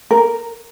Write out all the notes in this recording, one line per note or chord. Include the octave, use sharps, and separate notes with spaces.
A#4